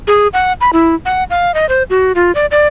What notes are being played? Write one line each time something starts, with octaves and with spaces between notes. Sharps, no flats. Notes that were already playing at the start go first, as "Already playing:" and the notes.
G#4
F#5
B5
E4
F#5
F5
D#5
C5
F#4
F4
D5
D5